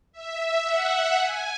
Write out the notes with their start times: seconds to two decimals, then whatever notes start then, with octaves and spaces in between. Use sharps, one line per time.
0.12 E5
0.64 F#5
1.15 G#5